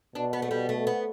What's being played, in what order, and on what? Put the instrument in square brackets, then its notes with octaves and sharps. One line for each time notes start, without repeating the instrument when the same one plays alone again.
[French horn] B2 [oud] D4
[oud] B3
A3
[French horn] B2 [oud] G3
[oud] A3
B3